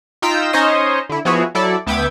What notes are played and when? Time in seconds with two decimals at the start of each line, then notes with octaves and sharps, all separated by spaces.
0.22 D#4 F4 G5 A#5 E6 B6
0.53 C#4 D#4 C5 C#5 D#5
1.09 D3 E4
1.25 F3 B3 E4 F#4 G#4 C#5
1.55 F#3 E4 A4 D5
1.86 D2 B3 E5 G5 D6 G#6